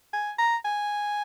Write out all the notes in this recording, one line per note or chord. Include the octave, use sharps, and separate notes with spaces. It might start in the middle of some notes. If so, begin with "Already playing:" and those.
G#5
A#5
G#5